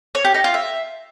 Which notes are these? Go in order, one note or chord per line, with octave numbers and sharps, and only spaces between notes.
C#5
G4
D#4
F4
E5